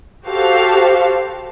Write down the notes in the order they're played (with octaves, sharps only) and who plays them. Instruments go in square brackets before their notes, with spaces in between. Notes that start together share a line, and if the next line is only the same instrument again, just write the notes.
[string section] F#4 G4 A4 C5 F5